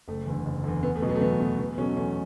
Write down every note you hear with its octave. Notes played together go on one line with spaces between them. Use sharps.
F#1 A3
E2 D3
F#1
E2 D3
E2 B3
A3
B2 F#3
B3
A3
E2 B3
B2 F#3 A3
E2 B3
B2 F#3 A3 C#4
E2 A3 C#4